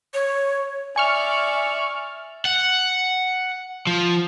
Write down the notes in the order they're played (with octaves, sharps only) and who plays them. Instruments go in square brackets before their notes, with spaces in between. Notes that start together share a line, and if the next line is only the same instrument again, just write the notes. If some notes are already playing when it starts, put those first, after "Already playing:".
[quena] C#5
[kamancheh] D5 E5 [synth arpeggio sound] G#5 C#6 F6
[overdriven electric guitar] F#5
F3